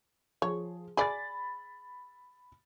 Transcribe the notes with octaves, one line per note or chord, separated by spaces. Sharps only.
F3 G#4 C#5
G#4 D5 B5 A6